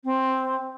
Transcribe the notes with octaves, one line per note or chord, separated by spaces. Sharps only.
C4